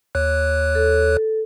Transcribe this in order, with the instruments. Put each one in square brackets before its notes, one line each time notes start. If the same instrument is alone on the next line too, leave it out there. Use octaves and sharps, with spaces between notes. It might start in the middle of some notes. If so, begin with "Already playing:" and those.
[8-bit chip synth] D#2 C#5 F#6
[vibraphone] A4